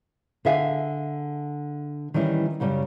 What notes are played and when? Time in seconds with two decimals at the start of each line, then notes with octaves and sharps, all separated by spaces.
0.45 D3 G#4 E5 F5 G#5
2.14 D#3 E3 G3 C#4 E4
2.60 F#2 C#3 G3 C#4